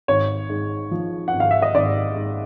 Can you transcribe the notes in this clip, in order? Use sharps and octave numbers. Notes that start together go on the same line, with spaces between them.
G#1 C#5
G#2
F3
F#5
G#1
F5
E5
D#5
G#1 D5
G#2